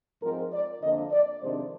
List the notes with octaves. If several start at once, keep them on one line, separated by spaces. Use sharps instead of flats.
G#2 F3 G#3 C4 A#4
D5
F2 D3 F3 A#3 D4 D#5
D5
F2 C3 D#3 G#3 D4 C5